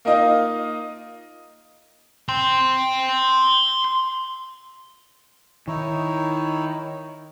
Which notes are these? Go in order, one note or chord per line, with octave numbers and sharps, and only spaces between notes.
A#3 D#4 F4 D#5
G5 C6
D#3 D#4 E4 C#5